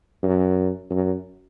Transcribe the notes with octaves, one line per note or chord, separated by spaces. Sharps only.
F#2
F#2